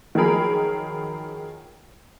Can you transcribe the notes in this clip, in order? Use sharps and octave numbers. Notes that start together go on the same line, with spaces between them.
D#3 F3 F#3 G#4 A#4 B5